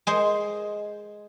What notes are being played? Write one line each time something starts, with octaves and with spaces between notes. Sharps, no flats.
G#3 G#4 C5